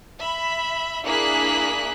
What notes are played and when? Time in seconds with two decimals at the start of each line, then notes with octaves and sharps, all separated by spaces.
0.19 E5 B5
1.04 A#3 D4 E4 G#4 F#6 B6